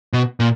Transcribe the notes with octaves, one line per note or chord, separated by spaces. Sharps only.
B2
A#2